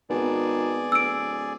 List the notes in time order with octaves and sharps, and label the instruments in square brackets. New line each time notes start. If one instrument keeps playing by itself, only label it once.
[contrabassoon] G#1 [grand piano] B3 [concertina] G#4 D5
[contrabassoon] D1 [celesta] E6 D7